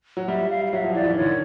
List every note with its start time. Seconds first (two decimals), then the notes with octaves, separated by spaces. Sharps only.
0.17 F#3
0.28 G3 E5
0.50 F5
0.65 F5
0.72 F#3 E5
0.84 F3
0.94 E3 D5
1.05 E3
1.13 D#3
1.16 D3 C#5
1.29 D#3